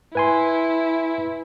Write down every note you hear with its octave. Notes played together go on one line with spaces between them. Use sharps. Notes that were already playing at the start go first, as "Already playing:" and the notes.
E4 B4 G#5 C6